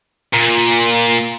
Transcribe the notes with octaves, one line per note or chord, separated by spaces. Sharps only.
A#2